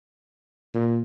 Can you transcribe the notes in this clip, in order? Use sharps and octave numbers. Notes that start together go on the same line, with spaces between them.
A#2